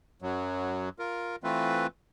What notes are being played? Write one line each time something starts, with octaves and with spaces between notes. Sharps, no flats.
F#2 F#3
F4 A#4
E3 A3 C4 F4 B4